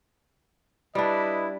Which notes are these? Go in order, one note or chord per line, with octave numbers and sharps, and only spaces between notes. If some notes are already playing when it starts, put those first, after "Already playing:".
G3 D4 E4 B4 D#5